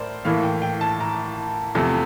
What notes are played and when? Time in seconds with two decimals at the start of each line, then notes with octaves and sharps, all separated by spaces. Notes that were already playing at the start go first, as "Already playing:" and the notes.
Already playing: A2 A#4 C5 D5
0.25 A2 E3 A#3 E4 F5
0.43 G5
0.62 G5
0.81 A5
1.00 A#5
1.75 E2 C3 F3 A3